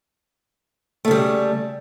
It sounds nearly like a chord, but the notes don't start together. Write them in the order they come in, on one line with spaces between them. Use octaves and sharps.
A3 C#3 G3